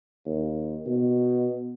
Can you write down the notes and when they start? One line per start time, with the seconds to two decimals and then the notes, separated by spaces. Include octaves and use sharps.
0.26 D#2
0.87 B2